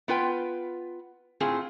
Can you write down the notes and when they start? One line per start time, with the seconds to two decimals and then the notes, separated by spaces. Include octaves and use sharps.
0.08 B3 F4 B4 G5
1.40 A2 C4 F4 G#4